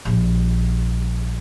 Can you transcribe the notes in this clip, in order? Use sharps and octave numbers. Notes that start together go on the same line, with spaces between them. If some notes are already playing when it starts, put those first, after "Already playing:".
A#1 G3